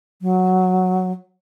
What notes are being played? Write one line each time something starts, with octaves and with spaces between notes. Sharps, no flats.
F#3